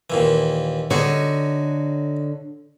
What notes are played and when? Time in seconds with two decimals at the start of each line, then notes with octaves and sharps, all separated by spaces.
0.10 D#2 A#2 E3
0.91 D3 D#4 F#4 C#5